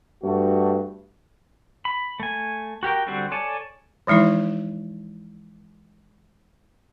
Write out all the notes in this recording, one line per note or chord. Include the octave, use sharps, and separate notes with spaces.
G2 A3 F#4
B5
A3 G#5
F#4 G4 A#4 G5
D3 G3 C4 F#4 C5
A4 C#5 D5 G#5 A5
E3 F3 G#3 D#4 E4